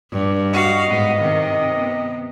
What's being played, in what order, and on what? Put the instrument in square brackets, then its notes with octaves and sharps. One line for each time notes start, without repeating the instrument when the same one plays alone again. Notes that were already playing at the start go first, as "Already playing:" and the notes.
[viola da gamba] G2
[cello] F#4 F5 [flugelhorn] D#5
[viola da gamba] G#2 [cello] B3
[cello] C3 [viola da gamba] D#3
[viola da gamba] B3